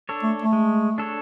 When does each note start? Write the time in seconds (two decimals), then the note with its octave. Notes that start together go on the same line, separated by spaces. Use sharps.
0.09 D4 A4 C#5
0.23 A3
0.42 A3
0.53 G#3
0.98 D4 A4 C#5